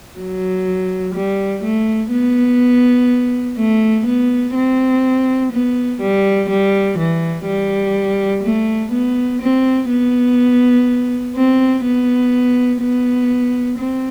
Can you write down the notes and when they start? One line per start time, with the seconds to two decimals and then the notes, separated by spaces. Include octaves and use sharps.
0.18 F#3
1.14 G3
1.63 A3
2.12 B3
3.57 A3
4.06 B3
4.55 C4
5.52 B3
6.01 G3
6.49 G3
6.98 E3
7.46 G3
8.43 A3
8.92 B3
9.42 C4
9.90 B3
11.36 C4
11.84 B3
12.81 B3
13.78 C4